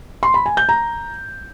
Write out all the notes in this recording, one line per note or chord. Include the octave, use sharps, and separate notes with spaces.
C6
B5
G#5
G6
A#5